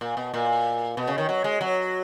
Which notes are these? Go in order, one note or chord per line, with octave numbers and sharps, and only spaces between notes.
A#2
B2
A#2
B2
C#3
D#3
F#3
G#3
F#3